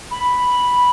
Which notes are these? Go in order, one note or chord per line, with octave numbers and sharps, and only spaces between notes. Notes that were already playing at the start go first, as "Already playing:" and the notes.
B5